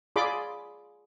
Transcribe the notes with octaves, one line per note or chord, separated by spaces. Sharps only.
F4 G#4 D5 B5 C6 D6